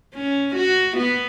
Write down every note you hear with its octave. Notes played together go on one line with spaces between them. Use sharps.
C#4
F#4
B3